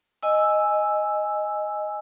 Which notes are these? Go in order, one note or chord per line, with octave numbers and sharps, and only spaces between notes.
D#5 G#5 E6